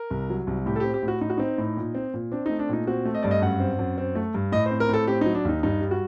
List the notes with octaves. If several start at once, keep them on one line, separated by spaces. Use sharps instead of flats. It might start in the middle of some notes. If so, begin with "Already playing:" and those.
Already playing: A#4
C2
F#3
C2
A2 G4
A4
C4 G4
G4
A2
F#4
A2 D#4
F#4
C4 D#4
A2
A#2
C4
A#2
C4 D4
A3 D#4
D4
A#2 D#4
C4 F#4
A3
D#5
G2 D5
D#5
F#2 F#5
C4
F#2
C4
A3
G2
A2 D#5
C5
C4
A#4
A2 A4
C4 G4
F#3 D#4
D4
D#2 D#4
G2 D#4
G3
F#4